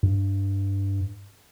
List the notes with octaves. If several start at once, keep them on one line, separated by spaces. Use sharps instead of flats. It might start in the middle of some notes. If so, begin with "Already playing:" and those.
G2